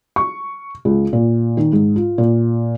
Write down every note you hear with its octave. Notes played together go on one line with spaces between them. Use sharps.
C#6
C#2
A#2
D#3
G#2
F4
A#2